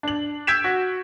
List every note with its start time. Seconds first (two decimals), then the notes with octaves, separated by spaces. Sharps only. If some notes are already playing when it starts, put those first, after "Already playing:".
0.03 D4 F#7
0.47 E6 G6 G#6 B6 D7 E7
0.64 F#4